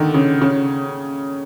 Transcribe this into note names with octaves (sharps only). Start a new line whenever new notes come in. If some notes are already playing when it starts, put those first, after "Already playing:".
Already playing: D3 D#3
C#3
C#3